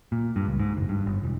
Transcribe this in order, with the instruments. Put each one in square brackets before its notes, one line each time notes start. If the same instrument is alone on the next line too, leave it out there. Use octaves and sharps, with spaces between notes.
[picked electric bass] A#2
G2
C#2
G#2
F#1
G2
G1
E1